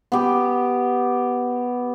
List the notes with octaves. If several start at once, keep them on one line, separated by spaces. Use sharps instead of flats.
B3 G4